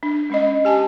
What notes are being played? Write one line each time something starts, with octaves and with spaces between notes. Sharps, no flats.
D4
G#3 C#4 D#5
G4 G#5 A5